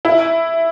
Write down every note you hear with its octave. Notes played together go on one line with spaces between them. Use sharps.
E4